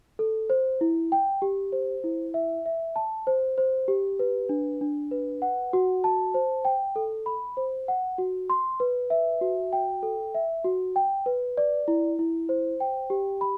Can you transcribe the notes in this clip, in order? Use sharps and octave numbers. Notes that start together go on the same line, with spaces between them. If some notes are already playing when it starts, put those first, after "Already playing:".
A4
C5
E4
G5
G4
C5
E4
E5
E5
A5
C5
C5
G4
B4
D4
D4
B4
F#5
F#4
A5
C5
G5
A4
B5
C5
F#5
F#4
C6
B4
E5
F#4
G5
A4
E5
F#4
G5
B4
D5
E4
E4
C5
G5
G4
B5